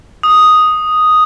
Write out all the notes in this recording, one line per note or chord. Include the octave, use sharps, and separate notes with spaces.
D#6